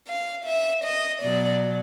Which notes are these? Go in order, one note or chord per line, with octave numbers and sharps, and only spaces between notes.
F5
E5
D#5
B2 F#3 D5